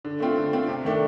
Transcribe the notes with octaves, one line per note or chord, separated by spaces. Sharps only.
D3
A3 C4 F4
D3
A3 C4 F4
C3
D#3 A3 D4